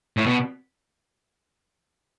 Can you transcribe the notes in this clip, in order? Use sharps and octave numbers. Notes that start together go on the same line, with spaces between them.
A2
B2